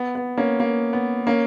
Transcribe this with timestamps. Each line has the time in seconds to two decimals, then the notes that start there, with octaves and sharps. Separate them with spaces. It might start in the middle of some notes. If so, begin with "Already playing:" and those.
Already playing: B3
0.15 B3
0.38 A#3 C#4
0.60 A#3
0.93 B3
1.27 A#3 C#4